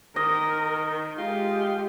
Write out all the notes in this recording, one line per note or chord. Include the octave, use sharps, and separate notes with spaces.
D#3 A#4 D#5
G#3 F4 G4